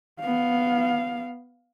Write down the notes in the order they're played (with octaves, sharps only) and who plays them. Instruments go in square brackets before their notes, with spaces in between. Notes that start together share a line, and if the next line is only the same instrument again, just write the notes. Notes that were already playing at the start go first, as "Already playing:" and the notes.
[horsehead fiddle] B3 F5